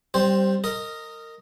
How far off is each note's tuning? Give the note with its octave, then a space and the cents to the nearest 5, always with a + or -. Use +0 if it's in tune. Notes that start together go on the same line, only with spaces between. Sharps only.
G3 -15 C4 +10 C5 +0
A#4 -25 D#5 +0